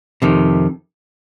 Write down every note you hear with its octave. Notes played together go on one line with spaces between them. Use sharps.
F2 C3 D#3